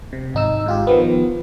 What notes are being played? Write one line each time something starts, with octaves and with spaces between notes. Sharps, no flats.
C3
G#1 D#4 E6
G#2 F4 G4
D#3 F3 B3